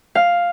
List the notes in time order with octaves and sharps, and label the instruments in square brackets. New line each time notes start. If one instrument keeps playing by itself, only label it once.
[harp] F5